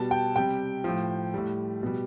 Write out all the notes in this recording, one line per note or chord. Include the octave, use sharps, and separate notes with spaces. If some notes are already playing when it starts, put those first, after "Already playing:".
Already playing: B2 G3 A5
G5
C3 G3 G5
A2 F3
A2 G3
B2 G3